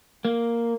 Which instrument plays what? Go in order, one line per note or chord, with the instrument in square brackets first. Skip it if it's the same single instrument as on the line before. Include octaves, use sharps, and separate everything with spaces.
[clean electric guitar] A#3